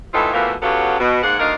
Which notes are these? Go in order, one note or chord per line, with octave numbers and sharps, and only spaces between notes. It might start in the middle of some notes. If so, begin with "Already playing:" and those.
A2 E3 C4 D#4 F4 A4
B2 E3 F3 A3 A#3
C#3 F#3 B3 F4 G4 A4
B2
G#2 A#3 F#5
D2 D4 D#4 A#4 F5